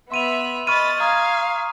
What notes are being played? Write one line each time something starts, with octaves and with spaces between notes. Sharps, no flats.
B3 E5 B5 C6 D#7 F7
D#5 B5 C#6 F6 A6 D#7
F5 A#5 D#6 G#6